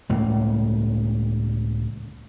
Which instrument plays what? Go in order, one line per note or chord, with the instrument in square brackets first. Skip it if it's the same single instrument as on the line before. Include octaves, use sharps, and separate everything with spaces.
[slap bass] C#2 A2 A#3